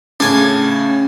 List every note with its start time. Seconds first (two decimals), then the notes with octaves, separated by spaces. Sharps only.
0.20 A2 C#3 C#4 D4 G#5